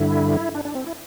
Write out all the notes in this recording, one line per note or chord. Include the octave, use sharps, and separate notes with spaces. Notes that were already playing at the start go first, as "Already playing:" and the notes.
Already playing: G2 D3 E4
D4
D4
C4
E4